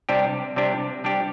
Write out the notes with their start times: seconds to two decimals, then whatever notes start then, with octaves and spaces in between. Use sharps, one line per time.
0.09 C3 G3 D4 G4
0.56 C3 G3 D4 G4
1.04 C3 G3 D4 G4